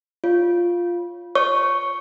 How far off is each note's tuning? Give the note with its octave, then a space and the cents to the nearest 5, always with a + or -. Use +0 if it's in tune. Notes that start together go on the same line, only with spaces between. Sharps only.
F4 +0 C#5 +0
C#5 +0 C#6 +5